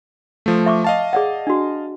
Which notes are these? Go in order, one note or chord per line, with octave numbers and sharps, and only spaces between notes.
F3 A3
E5 C#6 D6
D#5 F5 A5
G#4 D5 F#5
D4 F#4